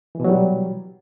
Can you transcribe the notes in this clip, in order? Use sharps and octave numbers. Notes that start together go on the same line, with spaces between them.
B2 E3 F#3 G3